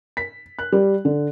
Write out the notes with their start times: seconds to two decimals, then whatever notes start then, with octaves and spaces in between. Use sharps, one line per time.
0.17 B6
0.59 F#6
0.72 G3
1.05 D3